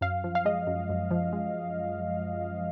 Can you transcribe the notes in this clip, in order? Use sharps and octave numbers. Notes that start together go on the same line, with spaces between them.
F#2 F5
F3
F5
G#3 D#5
F#2
F#2
F3
G#3